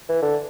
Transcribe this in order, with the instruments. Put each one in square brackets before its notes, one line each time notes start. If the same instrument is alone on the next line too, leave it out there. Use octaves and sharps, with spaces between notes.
[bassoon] E3
D3